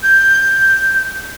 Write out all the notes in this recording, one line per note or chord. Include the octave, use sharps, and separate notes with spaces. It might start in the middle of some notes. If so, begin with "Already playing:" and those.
G6